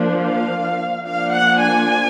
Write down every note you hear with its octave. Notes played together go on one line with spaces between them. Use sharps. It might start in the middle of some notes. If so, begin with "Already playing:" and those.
Already playing: F3 A#3 D4
F5
F3 A#3 D4 F5
F#5
G#5